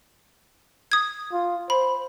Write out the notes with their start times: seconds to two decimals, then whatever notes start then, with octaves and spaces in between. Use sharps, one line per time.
0.92 D#6 G#6
1.32 F4
1.70 C5 B5